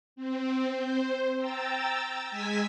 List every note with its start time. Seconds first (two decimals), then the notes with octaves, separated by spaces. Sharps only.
0.16 C4
0.77 C5
1.36 G5 A#5 E6 A6
2.30 G#3 G#5 E6 G#6 B6